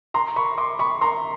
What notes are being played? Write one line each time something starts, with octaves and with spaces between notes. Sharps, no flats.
A#5 C6
B5 C#6
C6 D6
B5 C#6
A#5 C6